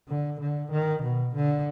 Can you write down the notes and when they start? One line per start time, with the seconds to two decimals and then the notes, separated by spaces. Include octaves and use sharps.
0.08 D3
0.40 D3
0.72 D#3
1.03 B2
1.35 D3